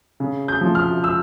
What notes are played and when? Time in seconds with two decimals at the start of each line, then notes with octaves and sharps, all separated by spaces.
0.20 C#3
0.48 G6
0.61 F3
0.75 F6
1.04 E6